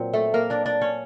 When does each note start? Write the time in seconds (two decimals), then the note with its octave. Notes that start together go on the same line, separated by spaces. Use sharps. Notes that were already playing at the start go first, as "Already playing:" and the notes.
Already playing: A#2 F#3 C4
0.13 A3 A4
0.34 A#3 A#4
0.50 D4 D5
0.66 D4 D5
0.81 C#4 C#5